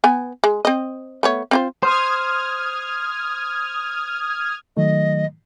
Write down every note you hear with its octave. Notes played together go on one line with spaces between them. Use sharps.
B3 G#5
G#3
C4 D#5
A3 B3 C#5
C4 F4 C5
C5 D#6 F6 G#6
D#3 F#3 A3 D#5